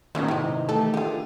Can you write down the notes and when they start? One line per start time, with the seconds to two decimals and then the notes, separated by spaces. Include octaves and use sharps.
0.15 A#2 D#3 G3 B3 C#4 E5
0.28 G#2 C3 E4 D#5
0.69 E3 A3 G4 A4
0.94 D3 F4 G4 G#4